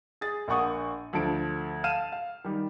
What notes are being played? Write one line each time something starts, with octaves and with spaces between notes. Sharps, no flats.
G#4 A6
A#1 A#3 F#5 C#6 D#6
D2 F3 A4 D7
F5 A5 F6 D#7 E7
F5
D#3 G3